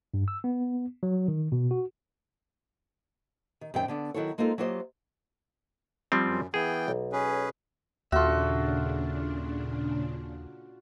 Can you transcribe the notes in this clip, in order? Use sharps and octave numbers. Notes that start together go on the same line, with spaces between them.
G2
E6
B3
F#3
D#3
B2
F#4
D#3
F#2 D#3 C4 G5
D3 B3 D4
D#3 F#3 E4 F#4 A4 C#5
G#3 A#3 C4 D#4 F4 A4
F#3 A#3 F4 G4 C5 D#5
F3 G3 C4
F#2
E3 B3 G#4 G5
B1
C#4 G#4 B4
D#2 A#2 C#3 D4 F4 F#4 A4 E5